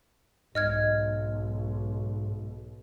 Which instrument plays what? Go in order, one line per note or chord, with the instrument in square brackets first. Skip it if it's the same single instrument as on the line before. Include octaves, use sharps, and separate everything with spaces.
[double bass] B1 [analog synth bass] G#2 [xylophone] D#5 F6 G#6